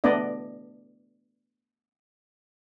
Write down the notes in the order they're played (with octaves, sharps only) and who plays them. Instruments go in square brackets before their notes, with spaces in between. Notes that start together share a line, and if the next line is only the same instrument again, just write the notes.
[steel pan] A3 B3 D4 D5 D#5